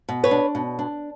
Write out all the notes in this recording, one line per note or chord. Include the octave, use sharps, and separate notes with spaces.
B2
B4 C#5
D4
B2
D4